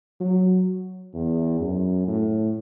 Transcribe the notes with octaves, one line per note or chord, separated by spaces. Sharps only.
F#3
E2
F#2
A2